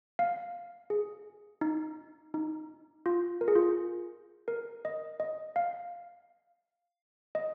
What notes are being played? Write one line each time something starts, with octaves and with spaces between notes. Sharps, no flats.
F5
G#4
D#4
D#4
F4
A#4
G#4
F4
G#4
A#4
D#5
D#5
F5
D#5